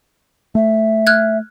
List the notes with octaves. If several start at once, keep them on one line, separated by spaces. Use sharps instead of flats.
A3 E5
F6 F#6 G#6